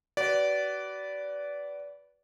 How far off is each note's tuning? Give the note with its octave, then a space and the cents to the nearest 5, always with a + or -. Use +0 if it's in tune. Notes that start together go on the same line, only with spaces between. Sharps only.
F#4 +40 B4 +0 D5 -20